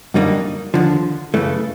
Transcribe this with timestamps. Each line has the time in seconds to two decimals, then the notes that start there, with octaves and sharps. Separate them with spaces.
0.14 F#2 D3 G3 A#3 D#4
0.74 D#2 D3 F3
1.34 F#2 C#3 E3 A3